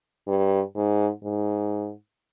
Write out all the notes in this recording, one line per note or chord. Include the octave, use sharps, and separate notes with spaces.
G2
G#2
G#2